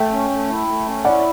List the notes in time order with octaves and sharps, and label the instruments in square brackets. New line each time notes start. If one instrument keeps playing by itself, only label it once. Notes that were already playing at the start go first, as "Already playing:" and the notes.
Already playing: [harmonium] A3 [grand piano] E5 G5
[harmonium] C#4
A3
E4
A3
C#4
[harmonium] E4 [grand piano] D5 F#5